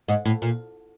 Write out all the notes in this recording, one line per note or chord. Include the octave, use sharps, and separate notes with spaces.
G#2
A2
A#2